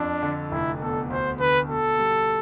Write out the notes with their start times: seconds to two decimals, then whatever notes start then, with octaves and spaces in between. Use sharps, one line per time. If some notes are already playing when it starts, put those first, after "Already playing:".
Already playing: F2 D4
0.23 D3
0.51 F1 E4
0.81 E2 A4
1.10 D2 C5
1.39 D3 B4
1.69 B2 A4
1.99 G3